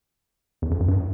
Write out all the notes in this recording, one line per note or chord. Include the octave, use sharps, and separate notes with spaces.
E2
F2
F#2
G2